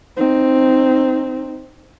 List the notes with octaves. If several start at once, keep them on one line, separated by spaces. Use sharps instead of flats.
C4 D#4